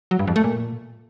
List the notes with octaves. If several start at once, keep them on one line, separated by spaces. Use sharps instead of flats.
F#3
G2
F2
A3
A#2